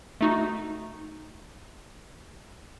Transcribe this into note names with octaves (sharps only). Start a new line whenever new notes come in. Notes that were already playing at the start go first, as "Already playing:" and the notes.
A3 D#4 F#4